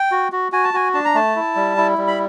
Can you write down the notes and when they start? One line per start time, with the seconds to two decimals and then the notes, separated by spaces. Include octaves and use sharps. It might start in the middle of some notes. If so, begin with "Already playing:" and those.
Already playing: G5
0.12 F#4
0.32 F#4
0.52 F#4 G#5
0.64 A5
0.74 F#4 G#5
0.94 D4 A5
1.05 A#5
1.15 A3 A5
1.36 E4
1.56 G3
1.77 E4
1.98 G3
2.07 B5